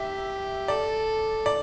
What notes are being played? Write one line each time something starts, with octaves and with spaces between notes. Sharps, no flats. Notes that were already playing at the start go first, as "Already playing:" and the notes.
Already playing: G4 E5
A4 D5
D5